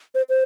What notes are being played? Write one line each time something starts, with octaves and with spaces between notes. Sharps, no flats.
C5
C5